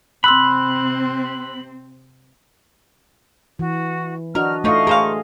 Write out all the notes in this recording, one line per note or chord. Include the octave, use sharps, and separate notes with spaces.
C3 C4 B5 C6 E6 F#6
E3 F#4
D4 F#4 A#4 D#5 F6
D3 A3 D#4 F4 D#5 F5 C#6
G#4 A#4 C5 F5